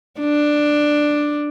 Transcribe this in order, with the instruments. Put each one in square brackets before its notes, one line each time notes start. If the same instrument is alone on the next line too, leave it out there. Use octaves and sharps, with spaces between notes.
[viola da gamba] D4